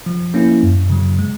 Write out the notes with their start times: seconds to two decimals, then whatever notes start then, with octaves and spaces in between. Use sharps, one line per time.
0.06 F3
0.34 A#3 C#4 E4
0.63 F#2
0.90 C#3 F#3
1.19 G#3